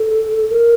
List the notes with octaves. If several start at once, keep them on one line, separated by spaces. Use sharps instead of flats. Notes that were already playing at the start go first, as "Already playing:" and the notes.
Already playing: A4
A#4